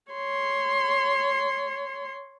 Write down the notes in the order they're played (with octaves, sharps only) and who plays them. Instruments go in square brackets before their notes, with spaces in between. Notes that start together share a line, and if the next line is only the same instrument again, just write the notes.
[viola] C#5 C6